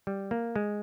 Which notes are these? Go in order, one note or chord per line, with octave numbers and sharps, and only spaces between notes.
G3
A#3
G#3